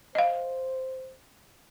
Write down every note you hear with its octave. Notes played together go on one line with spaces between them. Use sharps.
C5 D#5 F5